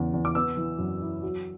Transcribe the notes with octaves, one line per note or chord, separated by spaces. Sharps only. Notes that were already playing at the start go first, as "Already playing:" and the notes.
Already playing: E2 C#3
E2
D6
B3 E6
E3
F#2
E4
F#3